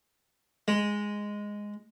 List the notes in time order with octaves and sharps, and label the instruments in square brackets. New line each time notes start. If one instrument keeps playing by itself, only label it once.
[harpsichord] G#3